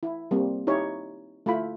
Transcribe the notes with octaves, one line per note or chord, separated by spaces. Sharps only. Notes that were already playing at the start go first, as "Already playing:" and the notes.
E4
G3 A#3 C4
D#4 E4 G4 C#5
A3 E4 F4 B5